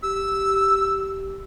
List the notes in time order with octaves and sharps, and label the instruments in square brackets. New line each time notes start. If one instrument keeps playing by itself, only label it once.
[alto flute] G4 [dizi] E6